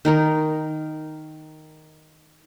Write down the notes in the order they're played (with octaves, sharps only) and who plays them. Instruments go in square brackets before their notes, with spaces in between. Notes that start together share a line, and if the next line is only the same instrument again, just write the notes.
[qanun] D#3 D#4 A#4